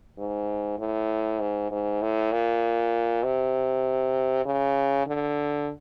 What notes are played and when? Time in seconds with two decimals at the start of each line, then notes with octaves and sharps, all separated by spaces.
0.18 G#2
0.79 A2
1.40 G#2
1.71 G#2
2.02 A2
2.32 A#2
3.24 C3
4.46 C#3
5.07 D3